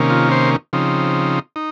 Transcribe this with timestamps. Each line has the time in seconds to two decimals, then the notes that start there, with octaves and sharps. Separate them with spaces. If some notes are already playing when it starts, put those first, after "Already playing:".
Already playing: C3 D#3 A#3 C#4
0.10 F4
0.31 C5
0.73 C#3 F3 C4 D#4
1.56 D#4